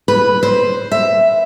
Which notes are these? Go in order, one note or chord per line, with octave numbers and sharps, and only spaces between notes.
B4
C5
E5